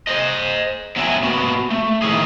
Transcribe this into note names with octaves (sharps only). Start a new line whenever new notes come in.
C5 D#5
F#3 B3 E5 F5 G5 G#5
A#3 B3 F#4
A3
D#3 E4 G#4